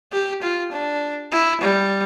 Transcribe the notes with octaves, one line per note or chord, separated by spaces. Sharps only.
G4
F4
D4
E4
G3